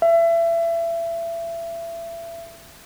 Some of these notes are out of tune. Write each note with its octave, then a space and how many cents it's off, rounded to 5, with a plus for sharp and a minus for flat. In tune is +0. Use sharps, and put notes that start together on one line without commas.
E5 +30